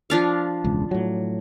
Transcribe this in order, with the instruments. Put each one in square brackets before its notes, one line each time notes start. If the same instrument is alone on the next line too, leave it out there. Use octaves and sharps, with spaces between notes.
[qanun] F3 D4 F5
[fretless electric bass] E1 C#2
A2 F#3